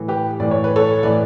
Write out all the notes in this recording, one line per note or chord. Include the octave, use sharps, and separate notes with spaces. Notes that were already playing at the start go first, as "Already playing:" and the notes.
Already playing: A2 E3
G4 B4
A2 E3 D5
C#5
B4
A4 C#5
A2 E3 B4 D5